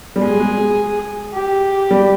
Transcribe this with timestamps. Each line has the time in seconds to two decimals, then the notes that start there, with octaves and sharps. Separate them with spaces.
0.16 G3
0.21 G#3 G#4
0.40 G#3
0.59 G#3
1.34 G4
1.91 G3